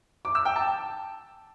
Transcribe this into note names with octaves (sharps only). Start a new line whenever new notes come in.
D6
E6
G5
A5